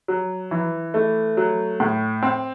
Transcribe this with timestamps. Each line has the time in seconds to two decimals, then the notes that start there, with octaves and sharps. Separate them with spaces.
0.08 F#3
0.51 E3
0.94 A3
1.37 F#3
1.80 A2
2.23 C4